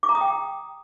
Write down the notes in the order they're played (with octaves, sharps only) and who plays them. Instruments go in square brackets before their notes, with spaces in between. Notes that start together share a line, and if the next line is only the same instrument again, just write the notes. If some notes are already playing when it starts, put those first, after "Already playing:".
[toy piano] D6
A#5
D#6
G5